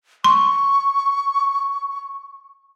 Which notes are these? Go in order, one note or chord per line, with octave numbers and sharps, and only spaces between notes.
C6 C#6